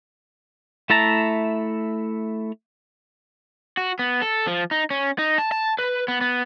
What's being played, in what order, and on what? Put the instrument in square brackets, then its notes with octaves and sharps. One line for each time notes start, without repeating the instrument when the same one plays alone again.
[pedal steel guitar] A3 E4 E5 A5 A#5
[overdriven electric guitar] F#4
B3
A4
F3
D#4
C#4
D#4
A5
A5
B4
B3
B3